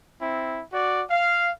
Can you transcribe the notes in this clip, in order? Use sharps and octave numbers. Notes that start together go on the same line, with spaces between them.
C4 E4
F#4 D5
F5